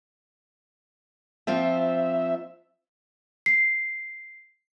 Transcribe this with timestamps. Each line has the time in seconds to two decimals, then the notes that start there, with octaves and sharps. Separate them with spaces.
1.47 F3 C4 F4 E5
3.46 C7